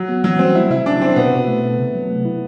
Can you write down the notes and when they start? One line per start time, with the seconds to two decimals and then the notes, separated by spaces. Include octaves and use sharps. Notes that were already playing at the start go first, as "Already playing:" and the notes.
Already playing: F#3
0.09 B3
0.24 E3 F#3
0.39 G3 C4
0.55 A3 E4
0.70 C3 E4
0.86 F#3 D4
1.01 C3 C4
1.16 B2 B3
1.32 B2
1.48 A3
1.64 A3
1.79 C3
1.95 F#3
2.10 A3
2.25 E4